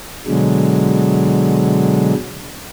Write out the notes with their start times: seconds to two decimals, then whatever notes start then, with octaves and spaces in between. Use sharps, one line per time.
0.27 B2 D3 F#3 G#3